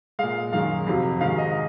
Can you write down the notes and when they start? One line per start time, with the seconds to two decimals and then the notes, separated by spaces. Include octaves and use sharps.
0.19 A#2 G#3 F5
0.52 F#2 D#3 G#3 F5
0.87 F2 C3 F#3
1.21 G#2 D#3 G#3 F5
1.38 D#5